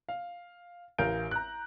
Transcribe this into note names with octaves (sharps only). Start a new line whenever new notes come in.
F5
A1 A#4 F5 G6 D7
A#5 F#6